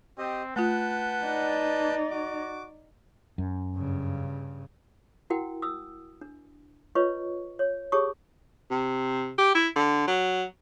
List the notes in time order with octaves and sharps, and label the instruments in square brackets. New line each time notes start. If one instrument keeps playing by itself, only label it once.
[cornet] C4 [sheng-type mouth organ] G4 D#5
[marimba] A3 F4 [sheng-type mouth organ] B4 A5 G6 [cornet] F#5
[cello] D#4 D5
[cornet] F#4 [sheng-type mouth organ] D6
[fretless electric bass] F#2
[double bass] G2 C#3
[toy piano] E4 F#4 A#4 F#5 G5
D#6 E6
D4
F4 B4 C#5 D#5 C#6
C#5
G4 G#4 C#5 A5 C#6 D#6
[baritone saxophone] C3
G4
E4
D3
F#3